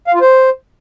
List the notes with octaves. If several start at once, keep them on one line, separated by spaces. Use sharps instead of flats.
F5
F4
C5